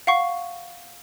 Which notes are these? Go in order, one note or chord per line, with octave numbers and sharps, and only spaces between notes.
F5 F#5 C#6